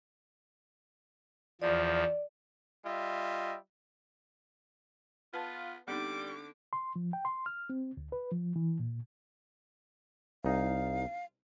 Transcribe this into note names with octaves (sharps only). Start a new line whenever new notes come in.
E2 F3 D5
G3 F4 D#5 E5
B3 F4 B4 F#5 A5
D3 G3 B3 C4 D#4 D6
C6
F3
G5
C6
F6
C4
D2
B4
F3
E3
A#2
C2 D#4 F5